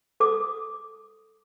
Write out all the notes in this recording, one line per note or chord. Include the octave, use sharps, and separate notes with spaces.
A4 D6 D#6